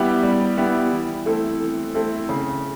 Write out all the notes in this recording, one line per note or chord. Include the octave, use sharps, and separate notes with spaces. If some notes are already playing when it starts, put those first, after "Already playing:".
Already playing: G3 B3 E4 G4
G3
B3 E4 G4
E3
A3 C4 E4 A4
E3
A3 C4 E4 A4
C#3